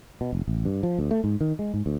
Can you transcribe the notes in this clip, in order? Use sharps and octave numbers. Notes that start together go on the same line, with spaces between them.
B2
F1
A1
G2
F3
D2
A3
G#2
D#3
G#3
G#2
D2